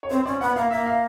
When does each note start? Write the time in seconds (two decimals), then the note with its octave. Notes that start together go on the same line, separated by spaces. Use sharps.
0.03 C#5
0.10 C4 C5
0.26 C#4 D5
0.41 B3 F#5
0.56 A#3 F5
0.70 A#3 E5
0.86 F5